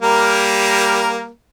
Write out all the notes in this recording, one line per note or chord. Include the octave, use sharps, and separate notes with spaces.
G3 A#3 A#4